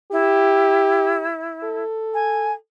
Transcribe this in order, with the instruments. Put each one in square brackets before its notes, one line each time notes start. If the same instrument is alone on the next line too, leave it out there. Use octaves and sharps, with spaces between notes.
[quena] E4 [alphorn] G4
[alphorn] A4
[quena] G#5